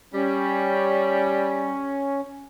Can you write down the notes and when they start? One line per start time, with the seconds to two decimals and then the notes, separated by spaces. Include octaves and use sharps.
0.14 G3 C#4